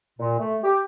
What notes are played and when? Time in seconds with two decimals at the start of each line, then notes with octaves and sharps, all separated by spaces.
0.20 A#2
0.39 A3
0.64 G4